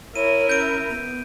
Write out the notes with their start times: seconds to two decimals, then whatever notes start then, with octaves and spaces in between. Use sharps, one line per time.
0.16 E4 A#4 C#5 D#7
0.49 C#4 G6 D7
0.89 B3